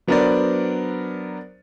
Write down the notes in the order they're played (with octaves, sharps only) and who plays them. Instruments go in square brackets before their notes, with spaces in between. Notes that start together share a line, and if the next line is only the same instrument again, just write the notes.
[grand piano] F#3 B3 D4 A#4 C5 D5